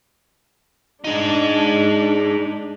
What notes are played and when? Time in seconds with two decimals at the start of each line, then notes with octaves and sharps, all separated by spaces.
1.04 G#3 D4 D#4